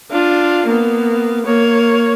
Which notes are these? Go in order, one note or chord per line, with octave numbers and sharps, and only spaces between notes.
D4 F4
A#3 B3
A#3 C#5